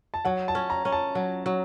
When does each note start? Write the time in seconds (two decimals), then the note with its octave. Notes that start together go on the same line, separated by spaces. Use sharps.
0.14 A5
0.25 F#3 F#5
0.48 A5
0.55 C#4
0.70 A#5
0.85 C#4
0.92 A5
1.15 F#3
1.46 F#3